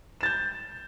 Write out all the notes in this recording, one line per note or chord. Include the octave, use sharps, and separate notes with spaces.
G6 A6 E7